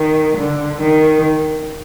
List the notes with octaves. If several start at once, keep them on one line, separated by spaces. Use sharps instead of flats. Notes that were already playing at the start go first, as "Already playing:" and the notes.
Already playing: D#3
D3
D#3